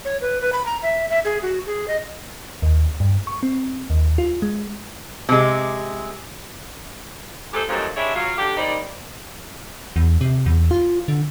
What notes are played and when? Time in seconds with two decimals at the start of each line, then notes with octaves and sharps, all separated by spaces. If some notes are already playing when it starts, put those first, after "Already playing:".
0.05 C#5
0.21 B4
0.41 B4
0.53 B5
0.66 A#5
0.83 E5
1.10 E5
1.25 G#4
1.42 F#4
1.66 G#4
1.88 D#5
2.62 D#2
3.00 G2
3.27 C#6
3.43 C4
3.90 D#2
4.18 F4
4.42 G#3
5.29 C3 G#3
7.54 G#3 A3 D#4 G4 A4 C5
7.69 G#2 C3 D#3 F3 F#3 A3
7.96 G3 G#3 D4 C#5 E5
8.15 F#3 F4 F5
8.38 D3 G4
8.57 G3 A#3 C4 D#4 D5
9.96 E2
10.21 C3
10.46 E2
10.71 F4
11.08 D3